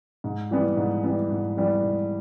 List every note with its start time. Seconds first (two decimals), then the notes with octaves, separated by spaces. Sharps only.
0.24 G#2
0.51 E3 G3 B3
0.77 G#2
1.03 E3 G3 B3
1.31 G#2
1.57 E3 G3 B3
1.83 G#2